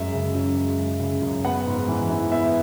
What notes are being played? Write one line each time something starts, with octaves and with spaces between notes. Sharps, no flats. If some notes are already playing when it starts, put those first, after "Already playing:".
Already playing: F#2 G#3 E5
C#3
F#2
G#3
F#2
C#3
F#2
B3 F#5
G#2
E3
E4
B3 E5